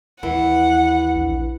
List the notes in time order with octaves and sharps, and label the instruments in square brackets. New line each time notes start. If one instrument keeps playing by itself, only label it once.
[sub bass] D#2 [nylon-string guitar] E3 E4 B4 [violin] F#5
[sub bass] A#1